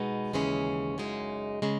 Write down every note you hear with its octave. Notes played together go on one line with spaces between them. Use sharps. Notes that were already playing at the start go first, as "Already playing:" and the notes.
Already playing: B2 G#3 B3 D#4
D#2 C#3 E3 G#3 C#4
F#2 C#3 G#3 D#4
C#3 G#3